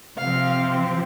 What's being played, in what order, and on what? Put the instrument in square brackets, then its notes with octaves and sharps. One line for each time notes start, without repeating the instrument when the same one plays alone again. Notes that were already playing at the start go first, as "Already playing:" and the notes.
[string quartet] C3 F3 C4 F5